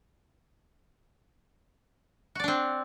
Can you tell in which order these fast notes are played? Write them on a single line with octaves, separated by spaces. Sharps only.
F#4 D5 D4 C4